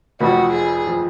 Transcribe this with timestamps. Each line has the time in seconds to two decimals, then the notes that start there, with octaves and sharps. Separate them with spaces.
0.21 F1 F2 F3 F#4
0.53 G#4
0.87 F3